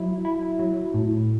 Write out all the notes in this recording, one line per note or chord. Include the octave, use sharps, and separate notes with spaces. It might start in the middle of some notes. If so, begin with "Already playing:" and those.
Already playing: F#3 E4
E4
F#3
A2